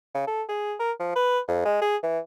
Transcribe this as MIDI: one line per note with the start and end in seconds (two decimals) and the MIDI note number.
0.15 0.23 49
0.27 0.43 69
0.49 0.74 68
0.80 0.92 70
1.00 1.12 53
1.16 1.39 71
1.48 1.63 41
1.65 1.79 56
1.82 1.97 68
2.03 2.19 52